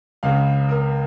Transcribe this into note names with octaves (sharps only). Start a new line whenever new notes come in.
C#2 C#3 F5
A#4